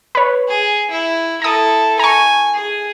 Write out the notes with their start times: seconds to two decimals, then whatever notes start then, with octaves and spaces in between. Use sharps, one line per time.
0.15 B4 C#5
0.49 G#4
0.91 E4
1.42 E4 A4 A#5 D#6
1.99 G#5 A#5 C#6
2.54 G#4